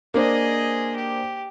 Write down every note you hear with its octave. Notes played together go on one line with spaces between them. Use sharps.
A#3 D4 G#4 C5 D#5
G4